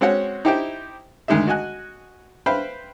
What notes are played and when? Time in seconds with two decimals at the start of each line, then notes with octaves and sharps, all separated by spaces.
0.01 G#3 C4 C#4 F#4 C#5 F#5
0.45 D#4 E4 G4 C5 E5 G5
1.28 D2 D#3 G#3 D#4 G#4 E5
1.47 F#4 D#5 G#5 F#6
2.46 B4 C5 E5 F5 G5 B5